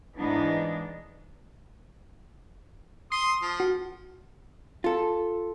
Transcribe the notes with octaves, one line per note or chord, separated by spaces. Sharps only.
G#2 E3 B3 D4 D#4
C6 D#6 C7
F3
F#4
F4 A4